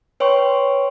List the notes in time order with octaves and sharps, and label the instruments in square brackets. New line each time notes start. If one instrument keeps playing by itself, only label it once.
[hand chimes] B4 C#5 G5 C6 C#6